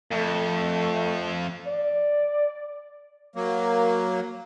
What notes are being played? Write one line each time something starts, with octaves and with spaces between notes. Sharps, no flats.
F2 A3
D5
F#3 A#3